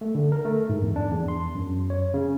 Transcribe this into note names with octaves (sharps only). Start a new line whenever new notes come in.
A3
D3
A#4
A3
G#2
E2
D4
E2
C6
F#2
C#5
C#3